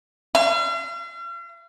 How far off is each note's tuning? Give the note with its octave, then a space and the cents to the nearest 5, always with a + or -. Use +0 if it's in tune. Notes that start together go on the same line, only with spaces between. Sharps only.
F5 -40